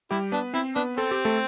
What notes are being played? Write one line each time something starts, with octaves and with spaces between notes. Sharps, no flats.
G3 E4 G4
B3 D4 B4
C4 E4 C5
B3 D4 B4
C4 A4
G4
A3 A4